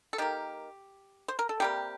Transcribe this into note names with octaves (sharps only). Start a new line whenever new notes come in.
A4
D#3 A#3 G4
C5
A#4
A4
C3 G3 A#3 G4